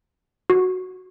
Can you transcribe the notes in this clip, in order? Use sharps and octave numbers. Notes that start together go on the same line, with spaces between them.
F#4